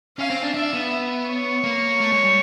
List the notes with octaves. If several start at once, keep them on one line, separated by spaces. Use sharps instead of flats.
C#4 F5
C4
D4
D4 E5
B3
C#5
A#3
A3
G#3
G3